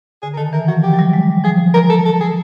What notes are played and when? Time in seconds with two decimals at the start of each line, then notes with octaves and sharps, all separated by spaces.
0.22 D3 G#4
0.34 A#4
0.37 D#3 A4
0.53 E3 A#4
0.68 F3 F#4
0.83 G4
0.94 F#3
0.99 G3
1.13 G#3
1.44 F3 G#4
1.74 A#4
1.90 A4
2.06 A4
2.21 G#4